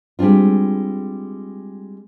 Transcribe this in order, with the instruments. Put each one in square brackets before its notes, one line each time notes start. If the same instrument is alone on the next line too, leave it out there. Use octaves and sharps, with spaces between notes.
[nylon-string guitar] G3 G#3 C4 D4 F4